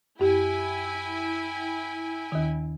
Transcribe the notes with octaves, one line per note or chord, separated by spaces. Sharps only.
F#2 E4 G4 G5 G#5
D#2 D#3